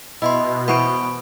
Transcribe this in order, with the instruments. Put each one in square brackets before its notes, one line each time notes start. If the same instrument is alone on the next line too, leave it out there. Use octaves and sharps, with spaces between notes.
[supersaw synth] B2 [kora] E4 [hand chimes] D#5 B5 C6
[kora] E3 B3 C5 [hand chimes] B5 C#6 D7